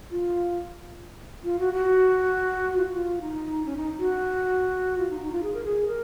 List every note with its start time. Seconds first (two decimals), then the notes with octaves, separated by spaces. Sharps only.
0.11 F4
1.44 F4
1.59 F#4
1.74 F#4
2.77 F4
2.85 F#4
2.93 F4
3.21 D#4
3.66 C#4
3.77 D#4
3.99 F#4
4.98 F4
5.10 D#4
5.21 D#4
5.32 F4
5.43 G#4
5.54 A#4
5.64 G#4
5.88 A#4